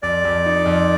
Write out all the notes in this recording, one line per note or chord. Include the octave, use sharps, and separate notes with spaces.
F2 D5
F2
D#4
F2